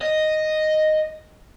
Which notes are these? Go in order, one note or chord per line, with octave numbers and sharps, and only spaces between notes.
D#5